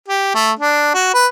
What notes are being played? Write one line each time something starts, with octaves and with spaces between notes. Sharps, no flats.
G4
A3
D4
F#4
B4